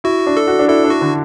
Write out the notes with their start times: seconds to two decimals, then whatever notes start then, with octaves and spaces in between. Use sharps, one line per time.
0.04 E4 F#4
0.26 D4
0.37 A4
0.47 F#4
0.59 D4
0.68 E4 A4
0.84 D4
0.90 F#4
1.01 D3